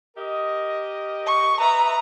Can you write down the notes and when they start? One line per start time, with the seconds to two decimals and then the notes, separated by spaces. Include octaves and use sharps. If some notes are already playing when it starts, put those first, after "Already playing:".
0.17 G4 A#4 D#5
1.26 C#6
1.60 B4 D#5 E5 A#5